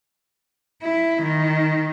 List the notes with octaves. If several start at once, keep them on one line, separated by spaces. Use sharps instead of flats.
E4
D#3